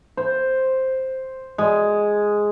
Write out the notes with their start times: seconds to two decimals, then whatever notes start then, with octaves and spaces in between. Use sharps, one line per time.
0.17 C5
1.58 G#3